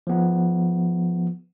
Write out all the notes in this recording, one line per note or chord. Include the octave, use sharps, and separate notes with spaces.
F3 B3